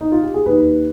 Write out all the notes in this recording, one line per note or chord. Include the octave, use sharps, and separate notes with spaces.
D#4
F4
G4
G#4
D#2 D#3 G4 B4